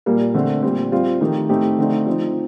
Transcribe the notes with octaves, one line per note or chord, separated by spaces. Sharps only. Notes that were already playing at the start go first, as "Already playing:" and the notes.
A#2 G3 A#3
D3 A3 C4
A#2 G3 C4
G3 C4 F4
D#3 A3 D#4 G4
A2 A3 C4 D#4 G4
D3 A3 C4 D#4
F3 C4 D#4